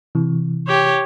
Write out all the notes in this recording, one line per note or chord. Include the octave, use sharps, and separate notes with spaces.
C3 E3
G4 C#5